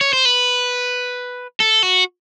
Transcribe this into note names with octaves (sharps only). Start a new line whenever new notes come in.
C#5
C5
B4
A4
F#4